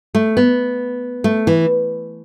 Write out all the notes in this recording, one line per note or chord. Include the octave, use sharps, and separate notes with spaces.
A3
B3
A3
E3